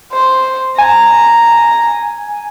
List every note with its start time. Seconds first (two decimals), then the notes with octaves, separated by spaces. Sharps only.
0.12 C5
0.78 G#5 A#5